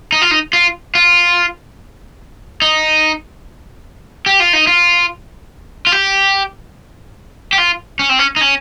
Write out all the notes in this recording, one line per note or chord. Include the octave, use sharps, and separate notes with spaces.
D#4
F4
D#4
F4
F4
D#4
G4
F4
D#4
F4
F4
G4
G4
F4
C#4
C4
C#4
D#4
C#4